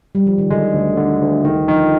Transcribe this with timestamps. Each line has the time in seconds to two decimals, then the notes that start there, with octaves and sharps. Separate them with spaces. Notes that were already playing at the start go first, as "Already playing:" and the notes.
0.15 G3
0.27 F3
0.38 D#3
0.50 D3 G#3
0.74 D2
0.97 D3
1.21 D2
1.45 D3 D#3
1.69 D#3 F3